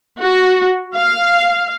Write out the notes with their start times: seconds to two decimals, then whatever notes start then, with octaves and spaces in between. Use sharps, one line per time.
0.19 F#4
0.93 F5